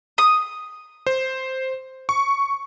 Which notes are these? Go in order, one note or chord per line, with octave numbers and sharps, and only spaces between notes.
D#6
C5
C#6